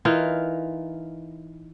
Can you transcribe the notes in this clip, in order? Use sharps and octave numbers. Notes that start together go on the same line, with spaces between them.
E3 D#4 F4 A#4